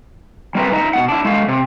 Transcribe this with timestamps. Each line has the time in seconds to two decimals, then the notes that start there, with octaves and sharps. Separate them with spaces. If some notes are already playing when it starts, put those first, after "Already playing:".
0.55 G3 C4 A#4 B4 E5
0.72 D#4 D#5 E5
0.94 B2 A#3 F#5
1.09 D4 E4
1.25 G#3 A3 F5
1.48 C3